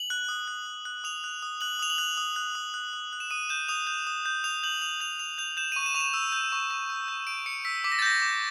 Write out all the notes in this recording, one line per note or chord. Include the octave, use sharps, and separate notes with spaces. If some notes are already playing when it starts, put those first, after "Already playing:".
Already playing: F#7
F#6
D#6
F#6
D#6
F#6
D#6 F7
F#6
D#6
F#6 F#7
D#6 F7
F#7
F#6
D#6
F#6
D#6
F#6
D#6
F#6
E7
D#6 D#7
G6 E7
D#6 F7
G6
D#6
G6
D#6 F7
G6 F#7
D#6 F7
G6 F7
D#6 F7
G6 F7
G6 E7
C#6 D#7
E7
C#6 F7
E7
E6
G6
C#6
C#6
E6
G6
C#6 D7
C#6 C#7
E6 B6
D6 B6
A#6
A6
G6 A#6
D6